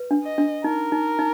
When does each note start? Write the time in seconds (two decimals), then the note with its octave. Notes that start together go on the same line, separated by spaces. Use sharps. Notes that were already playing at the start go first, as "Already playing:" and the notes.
Already playing: B4
0.11 D4
0.24 D#5
0.38 D4
0.64 D#4 A#4
0.92 D#4
1.19 D#4